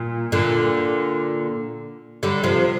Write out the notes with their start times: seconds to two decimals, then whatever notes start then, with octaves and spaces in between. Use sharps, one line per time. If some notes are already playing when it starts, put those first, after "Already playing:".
Already playing: A#2
0.32 A#2 D3
2.23 D3 G3
2.44 C3 F3